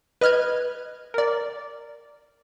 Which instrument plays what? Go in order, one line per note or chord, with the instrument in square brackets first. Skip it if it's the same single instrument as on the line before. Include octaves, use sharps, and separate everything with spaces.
[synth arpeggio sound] B4 D#5 F6 F#6 G#6
A#4 D5